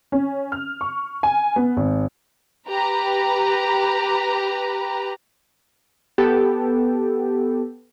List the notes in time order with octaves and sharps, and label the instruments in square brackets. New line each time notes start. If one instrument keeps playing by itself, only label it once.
[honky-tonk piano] C#4
F6
C#6
G#5
B3
G#1
[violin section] G4 B4 A#5
[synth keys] B3 G4 A4